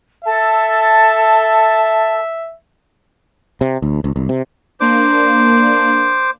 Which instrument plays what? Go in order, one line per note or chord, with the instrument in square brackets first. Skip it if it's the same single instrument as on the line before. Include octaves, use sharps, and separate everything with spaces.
[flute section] A4 A5 [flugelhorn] E5
[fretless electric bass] C3
D2
C#2
C2
C3
[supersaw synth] A#3 D4 [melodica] C5 D6